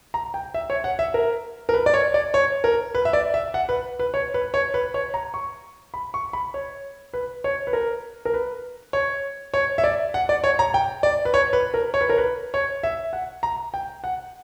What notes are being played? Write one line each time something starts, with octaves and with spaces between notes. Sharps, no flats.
A#5
G5
E5
C#5
F#5
E5
A#4
A#4
B4
D5
C#5
D5
C#5
A#4
B4
E5
D5
E5
F#5
B4
B4
C#5
B4
C#5
B4
C#5
A#5
C#6
B5
C#6
B5
C#5
B4
C#5
B4
A#4
A#4
B4
C#5
C#5
E5
D5
F#5
D5
C#5
A#5
G5
D5
B4
C#5
B4
A#4
C#5
B4
A#4
B4
C#5
E5
F#5
A#5
G5
F#5